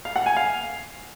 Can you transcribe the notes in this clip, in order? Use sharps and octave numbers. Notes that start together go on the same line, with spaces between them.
F5
F#5
G#5
F5